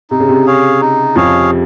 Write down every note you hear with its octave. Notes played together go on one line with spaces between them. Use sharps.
C3 D#4
C#3
C3
G#4 C#5 F5
D#4
F2 F3 G#4 C#5 F5